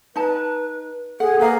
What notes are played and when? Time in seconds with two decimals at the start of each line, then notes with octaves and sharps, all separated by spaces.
0.16 D#4 B4 A5
1.20 G#4 A4 F#5
1.39 A#3 G#4 B4 F5